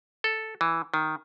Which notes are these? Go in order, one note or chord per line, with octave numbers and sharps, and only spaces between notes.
A4
E3
D#3